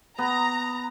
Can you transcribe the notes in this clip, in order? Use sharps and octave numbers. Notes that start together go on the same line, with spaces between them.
B3 A#5